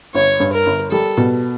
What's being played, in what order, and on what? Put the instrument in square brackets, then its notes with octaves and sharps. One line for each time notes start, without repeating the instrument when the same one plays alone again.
[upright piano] G1 [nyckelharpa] C#5
[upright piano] G2
[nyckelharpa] A#4
[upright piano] G1
[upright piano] G3 [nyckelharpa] A4
[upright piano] B2